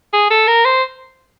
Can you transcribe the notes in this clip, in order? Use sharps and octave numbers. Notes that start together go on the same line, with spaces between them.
G#4
A4
A#4
C5